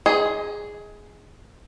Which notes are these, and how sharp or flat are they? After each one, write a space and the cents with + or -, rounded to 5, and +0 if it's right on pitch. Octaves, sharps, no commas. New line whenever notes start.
G#4 +0 D#5 +25